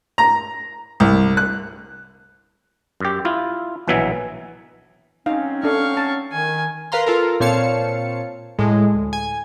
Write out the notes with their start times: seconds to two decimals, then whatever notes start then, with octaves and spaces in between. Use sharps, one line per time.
0.18 A#5
1.00 C2
1.37 F#6
3.00 F#2 G4
3.25 E4 F4
3.88 A#1 B2 E3 F#3 E5 G#5
5.26 F#3 C4 C#4 D#4 F5
5.64 D4 A4 F5 C#6
5.97 A5
6.32 D#3 G#5
6.92 A#4 B4 F5 A#5 C6
7.06 F4 A4 A#4
7.40 A#2 C4 C#5 F5 A5 C#7
8.59 A2 G#3
8.94 D2
9.13 G#5